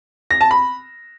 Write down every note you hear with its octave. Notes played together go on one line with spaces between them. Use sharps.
A#6
A5
B5